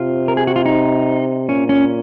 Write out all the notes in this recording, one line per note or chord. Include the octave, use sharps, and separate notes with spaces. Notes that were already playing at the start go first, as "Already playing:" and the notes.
Already playing: C3 F4
A#4
G#4
F#4
F4
D#4
A#2 C#4
C#4